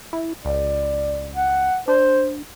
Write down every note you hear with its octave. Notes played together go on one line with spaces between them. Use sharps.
E4
C#2 D5
F#5
D4 C5